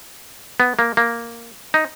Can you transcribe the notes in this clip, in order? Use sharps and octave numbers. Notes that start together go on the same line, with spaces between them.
B3
A#3
A#3
D#4